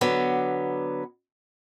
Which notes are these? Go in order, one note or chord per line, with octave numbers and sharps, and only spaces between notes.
D3 F#3 B3